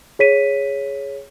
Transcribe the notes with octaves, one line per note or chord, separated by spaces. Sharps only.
G#4 C#5 B6 D#7